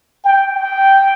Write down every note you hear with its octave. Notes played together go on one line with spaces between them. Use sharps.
G5
G5